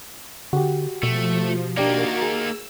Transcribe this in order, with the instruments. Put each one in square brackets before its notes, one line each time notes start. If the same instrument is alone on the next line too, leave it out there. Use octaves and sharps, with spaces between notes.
[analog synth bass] D3 [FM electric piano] F#4 G4
[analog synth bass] B2 [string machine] F3 [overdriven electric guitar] A3
[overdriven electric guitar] A#3 D#4 [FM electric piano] D4 G4 D5 [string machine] F#4 A#4 A6
[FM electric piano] G#4 [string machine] E6